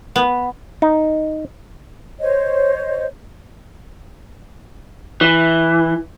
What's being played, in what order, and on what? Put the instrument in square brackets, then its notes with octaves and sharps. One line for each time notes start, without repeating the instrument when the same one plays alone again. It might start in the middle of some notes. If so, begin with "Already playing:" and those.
[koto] B3
[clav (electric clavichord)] D#4
[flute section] C5 C#5 D#5
[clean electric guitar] E3